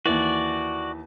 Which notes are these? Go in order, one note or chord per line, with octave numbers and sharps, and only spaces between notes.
D#2 E3 F#4 D5